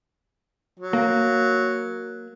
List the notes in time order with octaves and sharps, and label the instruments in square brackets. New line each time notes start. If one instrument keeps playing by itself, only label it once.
[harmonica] F#3
[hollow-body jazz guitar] A#3